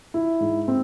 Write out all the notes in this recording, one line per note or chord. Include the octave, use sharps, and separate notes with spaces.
E4
G#2
C4